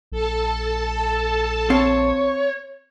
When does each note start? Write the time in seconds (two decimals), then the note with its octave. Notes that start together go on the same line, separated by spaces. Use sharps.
0.12 A#1 A4 A5
1.70 C4 C#5 F5